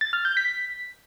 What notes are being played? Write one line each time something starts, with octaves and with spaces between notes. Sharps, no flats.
A6
F6
G6
B6